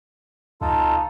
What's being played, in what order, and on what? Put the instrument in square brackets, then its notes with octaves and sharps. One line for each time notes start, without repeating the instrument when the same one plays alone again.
[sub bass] C#2 [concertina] D#4 F4 A4